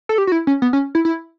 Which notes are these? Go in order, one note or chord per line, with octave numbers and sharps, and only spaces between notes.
A4
G4
F#4
E4
C#4
B3
C#4
E4
E4